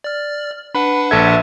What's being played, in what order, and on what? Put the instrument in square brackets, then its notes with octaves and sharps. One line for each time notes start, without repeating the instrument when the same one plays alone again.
[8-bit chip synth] D5 F6
[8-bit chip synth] D4 B4 F#5 [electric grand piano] B5
[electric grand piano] A#1 A4 G#6 [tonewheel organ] E5